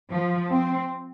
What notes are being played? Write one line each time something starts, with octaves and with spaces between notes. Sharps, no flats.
F3
C4